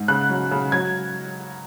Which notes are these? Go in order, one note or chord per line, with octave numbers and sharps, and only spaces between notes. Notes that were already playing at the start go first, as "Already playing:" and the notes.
Already playing: G#2
C#3 F#6
F#3
C#3
F#3 G#6